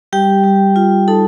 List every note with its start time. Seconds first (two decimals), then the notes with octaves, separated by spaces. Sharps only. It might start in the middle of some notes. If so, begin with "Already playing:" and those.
0.13 G3 G4 G5
0.44 G3
0.76 F4
1.08 D#4 A4 A5